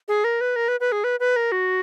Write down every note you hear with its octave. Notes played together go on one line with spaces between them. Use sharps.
G#4
A#4
B4
A#4
B4
B4
G#4
B4
B4
A#4
F#4